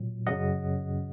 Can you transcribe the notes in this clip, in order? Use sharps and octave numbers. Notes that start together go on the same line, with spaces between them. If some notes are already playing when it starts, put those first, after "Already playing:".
Already playing: A#2 F#3
F#2 C#3 F#3 D#5 F#5